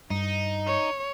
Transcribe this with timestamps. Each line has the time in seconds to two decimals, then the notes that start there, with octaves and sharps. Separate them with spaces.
0.10 G2 D#4
0.67 C#5